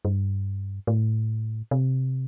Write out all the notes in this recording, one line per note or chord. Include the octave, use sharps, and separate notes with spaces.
G2
A2
C3